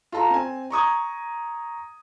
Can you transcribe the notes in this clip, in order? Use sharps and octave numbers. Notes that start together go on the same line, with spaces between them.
F4 A4 A5 A#5
C4 G#5
A#5 C#6 D#6 G#6